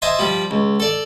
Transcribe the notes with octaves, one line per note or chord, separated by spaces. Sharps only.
C5 D#5 E5 G#5 A5 C6
F3 G3 G4
C#2
A4 D5